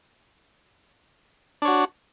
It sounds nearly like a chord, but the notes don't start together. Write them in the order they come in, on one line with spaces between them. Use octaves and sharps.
D4 C#5 F#4